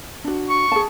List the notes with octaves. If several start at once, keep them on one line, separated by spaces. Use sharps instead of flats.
D4 F#4
C#6
G#4 A5